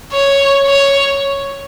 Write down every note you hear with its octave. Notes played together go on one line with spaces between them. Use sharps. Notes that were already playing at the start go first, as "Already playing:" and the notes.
C#5
C#5